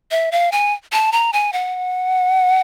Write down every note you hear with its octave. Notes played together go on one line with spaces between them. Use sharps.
E5
F5
G#5
A5
A#5
G#5
F#5